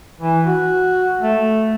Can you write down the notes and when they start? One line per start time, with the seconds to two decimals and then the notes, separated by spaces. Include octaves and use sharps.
0.21 E3
0.46 F#4
1.21 A3